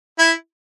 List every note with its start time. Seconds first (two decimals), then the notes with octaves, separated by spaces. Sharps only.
0.19 E4